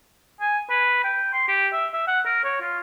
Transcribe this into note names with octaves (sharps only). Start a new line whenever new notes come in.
G#5
B4
G5
C6
G4
E5
E5
F#5
A#4
C#5
F4